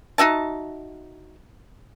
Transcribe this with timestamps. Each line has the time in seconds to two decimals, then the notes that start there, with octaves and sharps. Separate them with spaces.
0.18 D#4 F#4 E5 A5